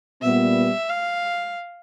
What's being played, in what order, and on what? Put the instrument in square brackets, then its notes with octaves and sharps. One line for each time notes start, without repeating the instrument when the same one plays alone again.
[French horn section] A#2 G3 B3 [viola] E5
[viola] F5